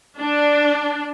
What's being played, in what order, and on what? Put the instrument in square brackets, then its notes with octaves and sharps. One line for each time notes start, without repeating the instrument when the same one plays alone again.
[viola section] D4